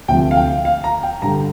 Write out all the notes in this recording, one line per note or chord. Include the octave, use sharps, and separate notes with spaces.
D2 C3 F3 G5
F5
G5
F5
A#5
G5
G2 D3 G3 A#5